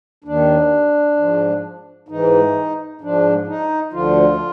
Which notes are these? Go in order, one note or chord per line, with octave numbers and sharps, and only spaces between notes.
D#2 D#3 D4
G#2 F3
G#2 E3 D#4
G#2 F3 D4
D#4
D2 D3 F3 F4